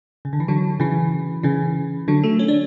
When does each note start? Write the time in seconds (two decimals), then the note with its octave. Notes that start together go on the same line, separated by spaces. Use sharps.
0.25 C#3
0.33 D3
0.40 E3
0.48 D3 F#3
0.80 C#3 E3
1.43 C#3 E3
2.08 D3 F#3
2.23 F#3 A3
2.39 C#4
2.48 D4